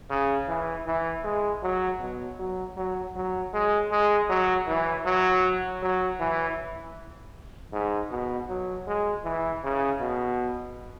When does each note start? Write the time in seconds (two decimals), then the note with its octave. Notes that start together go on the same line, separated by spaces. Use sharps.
0.10 C#3
0.48 E3
0.86 E3
1.24 G#3
1.63 F#3
2.00 B2
2.39 F#3
2.77 F#3
3.16 F#3
3.53 G#3
3.91 G#3
4.30 F#3
4.67 E3
5.05 F#3
5.82 F#3
6.20 E3
7.73 G#2
8.11 B2
8.49 F#3
8.87 G#3
9.25 E3
9.64 C#3
10.01 B2